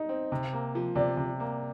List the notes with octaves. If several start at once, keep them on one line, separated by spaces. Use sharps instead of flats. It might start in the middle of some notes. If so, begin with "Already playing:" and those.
Already playing: D#4 D#5
C4
C3
A#3
F3
C3 D5
C3
A#3